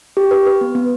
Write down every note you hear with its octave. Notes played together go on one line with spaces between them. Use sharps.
G4
B4
B4
B3
B3